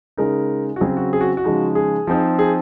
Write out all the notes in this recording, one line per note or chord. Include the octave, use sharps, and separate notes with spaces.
C#3 G#3 D#4 A#4
F#4
C#3 F#3 C4 G#4
F#4
G#4
F#4
F#4
C#3 F3 G#3 D#4
G#4
F3 C4 D#4
G#4